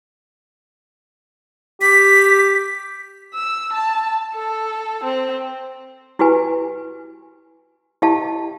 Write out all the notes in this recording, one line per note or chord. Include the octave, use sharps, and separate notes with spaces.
G4 B6
E6
A5
A4
C4
E4 F#4 G4 B4 G#5
E4 G4 D#5 F5 A5